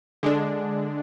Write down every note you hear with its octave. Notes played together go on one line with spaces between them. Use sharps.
D3 G#3 D4